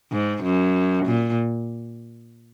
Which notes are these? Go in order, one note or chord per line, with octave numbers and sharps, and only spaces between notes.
G#2
F#2
A#2